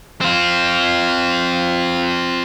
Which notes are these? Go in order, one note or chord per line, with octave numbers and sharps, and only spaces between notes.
C4 F4